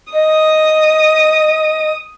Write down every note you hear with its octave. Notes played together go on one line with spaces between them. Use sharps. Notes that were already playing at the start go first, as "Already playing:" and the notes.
D#5 D#6